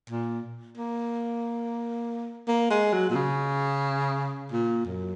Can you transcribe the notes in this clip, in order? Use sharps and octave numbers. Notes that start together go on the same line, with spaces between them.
A#2
A#3
A#3
G#3
F#3
A#2
C#3
A#2
F#2